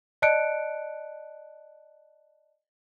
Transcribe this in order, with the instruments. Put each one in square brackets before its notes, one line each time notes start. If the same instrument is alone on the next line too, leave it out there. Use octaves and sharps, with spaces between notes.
[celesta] D5 D#5 A5 F#6 C#7 D7